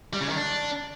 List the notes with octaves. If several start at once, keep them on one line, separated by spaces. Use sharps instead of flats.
G3
C#3
D#3
D4